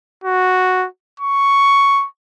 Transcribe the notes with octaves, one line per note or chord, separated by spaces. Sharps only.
F#4
C#6